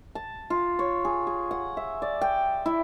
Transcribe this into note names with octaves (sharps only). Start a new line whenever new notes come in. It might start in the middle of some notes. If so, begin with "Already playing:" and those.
A5
F4
C#5
G#4
G#4
F#5
E5
D5
G5
E4